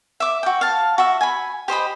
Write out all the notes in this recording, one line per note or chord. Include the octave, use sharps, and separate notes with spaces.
E5 D6
F#4 G5
F5 A5
F#4 E5
G#5 B5
G4 C5 D#5 B5